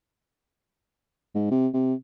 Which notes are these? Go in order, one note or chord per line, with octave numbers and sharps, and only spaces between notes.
G#2
C3
C3